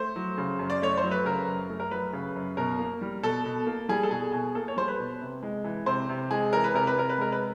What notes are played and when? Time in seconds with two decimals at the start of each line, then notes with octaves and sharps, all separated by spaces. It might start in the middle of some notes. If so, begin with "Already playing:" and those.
Already playing: A3 C5
0.16 F#3
0.38 C#3
0.59 F#2
0.70 D5
0.82 A3 C#5
0.97 C5
1.04 F#3
1.11 B4
1.25 C#3 A#4
1.47 F#2
1.69 A3
1.80 A#4
1.91 F#3 B4
2.13 C#3
2.35 F#2
2.57 B2 A#4
2.79 A#3
3.01 G3
3.23 B2 A4
3.46 B2
3.67 A#3
3.89 G3 G#4
4.03 A4
4.11 B2 G#4
4.32 B2 G#4
4.55 A#3 A4
4.68 C#5
4.77 G3 C5
4.88 B4
4.99 B2
5.21 C3
5.43 G#3
5.64 E3
5.86 C3 C5
6.09 C3
6.31 G#3 G#4
6.53 E3 A#4
6.64 B4
6.74 C3 A#4
6.87 B4
6.96 C3 A#4
7.09 B4
7.18 G#3 A#4
7.32 B4